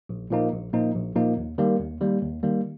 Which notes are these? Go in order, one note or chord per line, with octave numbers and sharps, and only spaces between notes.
A#1
A#2 F3 A#3 D#4
A#1
A#2 F3 A#3 D#4
A#1
A#2 F3 A#3 D#4
D#2
D#3 G3 A#3
D#2
D#3 G3 A#3
D#2
D#3 G3 A#3